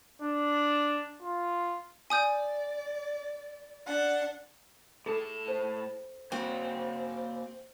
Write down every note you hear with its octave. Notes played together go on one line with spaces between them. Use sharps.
D4
F4
D5 G#5 D#6 G6
D4 F#5
A2 G#4 A4 A5
C5
A#3 C4 F#4